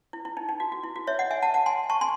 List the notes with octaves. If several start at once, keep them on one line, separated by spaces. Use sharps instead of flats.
E4
E4
D#4
D#4
F#4
F#4
E4
F#4
C#5 E5
D#5 F#5
E5 G#5
F#5 A5
F#5 A5
G#5 C6
A5 C#6
G#5 C6